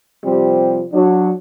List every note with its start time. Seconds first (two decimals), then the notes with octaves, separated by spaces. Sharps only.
0.24 C3 F3 G3 C4
0.92 F#3 D4